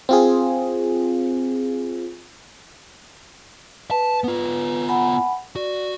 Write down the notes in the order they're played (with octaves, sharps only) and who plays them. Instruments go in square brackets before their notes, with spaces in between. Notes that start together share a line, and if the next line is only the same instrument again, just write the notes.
[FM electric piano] C4 F4 G#4
[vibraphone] B4 [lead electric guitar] A5
[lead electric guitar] B3 F4
[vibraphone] F#5 G#5 B5
[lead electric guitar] F#4 [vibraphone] D5